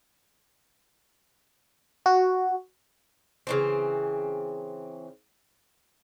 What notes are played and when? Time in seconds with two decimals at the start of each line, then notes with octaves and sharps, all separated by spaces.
2.06 F#4
3.47 C#3 E3 C4